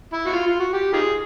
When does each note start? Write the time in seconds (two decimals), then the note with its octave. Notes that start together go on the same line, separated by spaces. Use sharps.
0.13 E4
0.25 F#4
0.33 F4
0.46 F4
0.60 F#4
0.73 G4
0.93 D#4 F4 G#4